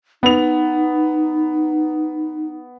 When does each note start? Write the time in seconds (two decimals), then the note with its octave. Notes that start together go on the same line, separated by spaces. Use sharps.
0.23 B3 D#4 F7